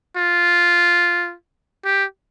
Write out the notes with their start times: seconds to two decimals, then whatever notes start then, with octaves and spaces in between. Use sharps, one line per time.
0.16 F4
1.85 G4